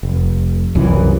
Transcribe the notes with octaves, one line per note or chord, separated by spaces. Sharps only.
F1
C2 F#2 C#3 E3